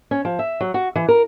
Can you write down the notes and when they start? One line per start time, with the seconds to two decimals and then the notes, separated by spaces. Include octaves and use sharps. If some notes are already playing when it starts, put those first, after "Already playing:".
0.11 C#4
0.25 F3
0.39 E5
0.61 F#3
0.74 F#4
0.95 E3
1.08 A#4